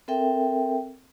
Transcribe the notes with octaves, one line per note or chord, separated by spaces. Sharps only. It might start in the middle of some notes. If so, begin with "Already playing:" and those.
C4 A4 A#4 E5 G5